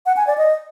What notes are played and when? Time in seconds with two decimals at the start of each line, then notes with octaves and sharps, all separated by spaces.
0.06 F#5
0.17 G#5
0.27 D5
0.38 D#5